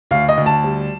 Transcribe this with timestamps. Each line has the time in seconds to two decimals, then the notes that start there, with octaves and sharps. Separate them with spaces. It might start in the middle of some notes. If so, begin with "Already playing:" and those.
0.11 D2 F5
0.29 D#5
0.37 D2
0.46 A5
0.64 G3